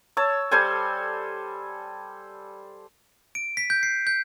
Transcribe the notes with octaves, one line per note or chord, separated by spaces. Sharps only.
C#5 A5 E6
G3 A4 C5 G#5
D7
B6
G6
C7
G6